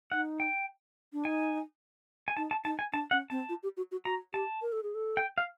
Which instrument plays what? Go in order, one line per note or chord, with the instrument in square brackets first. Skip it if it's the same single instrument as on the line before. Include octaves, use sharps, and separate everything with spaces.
[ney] D#4 [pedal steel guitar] F#5
[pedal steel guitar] G5
[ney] D4
[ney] D#4 [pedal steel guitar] G#5
[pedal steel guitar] G#5
[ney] D#4 [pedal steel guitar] A5
[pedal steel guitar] A5
[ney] D#4 [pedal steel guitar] A5
[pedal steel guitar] G#5
[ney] D4 [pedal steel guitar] A5
[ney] C#4 [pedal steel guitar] F#5
[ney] C4 [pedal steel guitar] A5
[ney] F4
G4
F#4
F#4
[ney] F#4 [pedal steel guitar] A#5
[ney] G4 [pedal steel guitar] A5
[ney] A#4
A4
G#4
A4
[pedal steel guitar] G5
F5